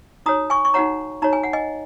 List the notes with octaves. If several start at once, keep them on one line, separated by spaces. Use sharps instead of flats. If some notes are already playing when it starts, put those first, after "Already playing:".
D#4 F#4 C#5 A#5 D#6
G#5 C#6
C#6
D#4 F#4 C#5 F#5 A#5
D#4 F#4 C#5 A#5
G#5
F#5
D#5 G#5